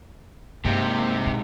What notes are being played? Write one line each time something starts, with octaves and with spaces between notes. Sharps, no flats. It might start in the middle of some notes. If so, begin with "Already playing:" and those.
G2 C3 G#3 A#3 D#4 G4
A#1 A#3